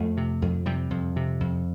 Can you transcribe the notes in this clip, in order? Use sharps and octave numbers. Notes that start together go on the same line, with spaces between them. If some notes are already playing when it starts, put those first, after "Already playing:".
Already playing: F2 A3
C3
F2
C3 G3
F2
C3
F2